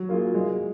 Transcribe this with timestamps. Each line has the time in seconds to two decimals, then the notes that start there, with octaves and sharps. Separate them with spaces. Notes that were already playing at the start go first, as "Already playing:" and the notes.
Already playing: F#3
0.09 A#3 F4 G#4
0.34 G#3